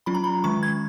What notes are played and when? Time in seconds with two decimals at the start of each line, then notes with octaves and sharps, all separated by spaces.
0.06 F#3 C#4 F4 B5
0.14 A#5
0.24 B5
0.44 D#3 G#3 C#4 C#6
0.63 G#6